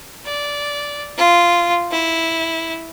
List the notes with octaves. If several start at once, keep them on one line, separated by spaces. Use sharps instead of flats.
D5
F4
E4